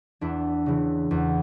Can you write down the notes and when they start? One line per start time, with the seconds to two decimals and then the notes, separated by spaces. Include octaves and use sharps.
0.21 E2 D4 E4
0.66 C#3 E3
1.11 E2